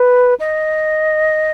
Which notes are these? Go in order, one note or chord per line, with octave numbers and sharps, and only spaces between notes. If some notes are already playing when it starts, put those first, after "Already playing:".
Already playing: B4
D#5